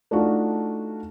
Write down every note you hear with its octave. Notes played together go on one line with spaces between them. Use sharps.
A3 D4 D#4 F4 F#4